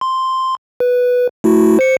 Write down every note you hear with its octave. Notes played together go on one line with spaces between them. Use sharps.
C6
B4
A3 E4 F#4
C5 C#7